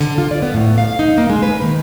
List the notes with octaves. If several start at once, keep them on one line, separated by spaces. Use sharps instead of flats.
D3
F4
D5
B3
A2
F5
D#4
A#3
G#3
B4
D#3